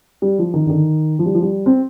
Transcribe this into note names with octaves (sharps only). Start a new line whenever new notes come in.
G3
F3
D#3
D3
D#3
F3
G3
F3
G3
C4